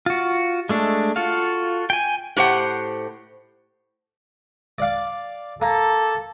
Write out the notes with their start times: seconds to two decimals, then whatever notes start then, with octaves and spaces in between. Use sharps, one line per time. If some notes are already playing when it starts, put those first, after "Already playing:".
0.06 F4 F#4
0.69 G#3 A3 D4
1.16 F4 F#4 A4 F5
1.90 G5 G#5
2.37 A2 G4 C5 F#5
4.78 D5 F5
5.62 A#3 A4